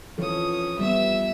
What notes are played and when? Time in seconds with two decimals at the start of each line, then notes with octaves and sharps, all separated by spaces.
0.18 E3 F3 C#4 A4 D#6
0.79 G3 B3 E5 E6